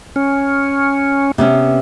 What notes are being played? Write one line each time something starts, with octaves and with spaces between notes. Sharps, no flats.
C#4
C3 B3 C#4